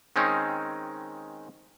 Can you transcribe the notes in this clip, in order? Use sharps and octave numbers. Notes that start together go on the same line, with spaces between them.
D#3 G#3 C4 C#4 D#4